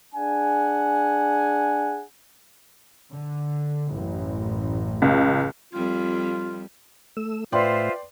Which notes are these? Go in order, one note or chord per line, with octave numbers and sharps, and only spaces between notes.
D4 G#4 F#5 G#5
D3
A1 F#2
C#2
F2 G3 F4
A3 E6
A2 F4 B4 C5 D5 E5 G5 C6